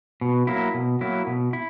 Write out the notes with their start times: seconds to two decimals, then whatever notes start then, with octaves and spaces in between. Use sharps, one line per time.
0.21 B2
0.47 F#3 A#3 E4
0.74 B2
1.01 F#3 A#3 E4
1.27 B2
1.53 E4